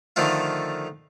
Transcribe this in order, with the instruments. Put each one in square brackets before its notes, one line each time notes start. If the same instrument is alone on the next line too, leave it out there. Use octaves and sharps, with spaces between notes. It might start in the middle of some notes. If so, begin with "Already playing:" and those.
[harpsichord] D3 D#3 F3 A3 F4